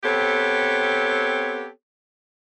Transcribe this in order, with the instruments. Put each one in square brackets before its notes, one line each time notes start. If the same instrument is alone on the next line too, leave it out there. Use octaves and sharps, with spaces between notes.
[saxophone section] B3 C4 G4 A4 C#5